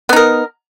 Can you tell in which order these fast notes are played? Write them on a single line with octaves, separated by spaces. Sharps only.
B3 D#4 A#4